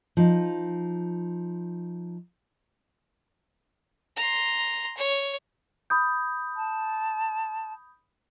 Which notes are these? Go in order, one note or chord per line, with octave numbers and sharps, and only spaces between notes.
F3 D#4
A#5 C6
C#5
B5 D#6 G6
A5